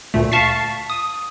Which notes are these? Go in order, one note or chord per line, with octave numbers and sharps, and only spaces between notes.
D2 A#2 A3
F5 A5 C#6 A6 B6 C7
D#6